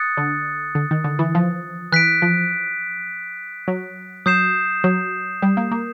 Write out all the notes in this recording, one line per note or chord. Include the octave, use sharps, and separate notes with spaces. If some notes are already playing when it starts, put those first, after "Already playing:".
Already playing: D#6 F#6 A6 C#7
D3
D3
D#3
D3
E3
F3
E3 F#6 B6 D7
F3
F#3
F#3 D#6 G6 C7 E7
F#3
G3
A#3
A#3